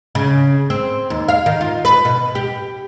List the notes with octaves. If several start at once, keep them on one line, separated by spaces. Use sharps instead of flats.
C#3
C4
D#2
F5
D#3
F4
B4
B2
G4